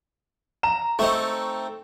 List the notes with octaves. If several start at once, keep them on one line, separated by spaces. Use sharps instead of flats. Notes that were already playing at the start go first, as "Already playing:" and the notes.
A#5 E7
A3 C4 D#4 C#6